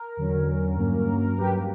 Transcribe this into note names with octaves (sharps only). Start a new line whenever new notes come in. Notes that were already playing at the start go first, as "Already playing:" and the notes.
Already playing: A#4
E2 D3 F#3 C#4
G2 F#3 A#3 C#4
G2 F#3 A#3 C#4 G4 B4